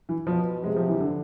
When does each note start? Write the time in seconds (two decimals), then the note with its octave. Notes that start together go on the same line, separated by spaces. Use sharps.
0.09 E3
0.27 B2 F3
0.64 C3 G#3
0.76 F3
0.89 E3
1.00 D3